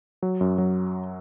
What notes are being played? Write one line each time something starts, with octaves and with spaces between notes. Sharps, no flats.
F#3
F#2
F#3